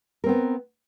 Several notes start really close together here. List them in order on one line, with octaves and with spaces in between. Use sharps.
A#4 C4 B3